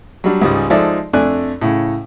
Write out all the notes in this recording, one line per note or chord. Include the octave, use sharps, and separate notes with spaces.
F#3 G3 D4
C#2 G#2 C#3 G3 D#6
F3 G#3 D#4 A4 D5 E5
F2 A3 D4 D5 G#5 F#6
A2 C#3